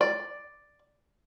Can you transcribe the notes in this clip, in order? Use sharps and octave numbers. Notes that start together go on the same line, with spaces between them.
D5